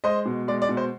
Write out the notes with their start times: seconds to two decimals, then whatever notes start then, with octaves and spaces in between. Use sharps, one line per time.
0.04 G#3 C5 D#5
0.26 B2
0.48 G#3 D5
0.62 D5
0.69 B2
0.77 C5